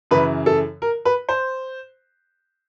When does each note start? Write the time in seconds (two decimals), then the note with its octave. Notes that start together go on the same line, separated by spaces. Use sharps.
0.11 F#2 C#3 E3 B4
0.46 A4
0.82 A#4
1.05 B4
1.29 C5